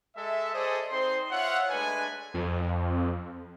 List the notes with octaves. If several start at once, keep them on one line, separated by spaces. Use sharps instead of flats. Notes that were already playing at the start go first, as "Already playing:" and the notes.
G#3 A4 E5
G#4 A4 C5 D5 D#5
C4 D#4 C5 C6
F4 C#5 E5 F#5
G#3 A3 D4 B4 G#5
F2